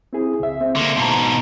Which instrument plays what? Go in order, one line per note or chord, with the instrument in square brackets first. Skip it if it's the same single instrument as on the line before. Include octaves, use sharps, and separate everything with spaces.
[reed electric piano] C4 E4 G#4
C#2 E5
C4
[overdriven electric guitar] D3 A#3 [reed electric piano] C6
[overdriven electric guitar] G#2 B2 [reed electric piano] A5 A#5